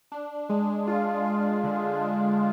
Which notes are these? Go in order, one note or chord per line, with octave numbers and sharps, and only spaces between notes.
D4
G#3
F4
F4
D3
D4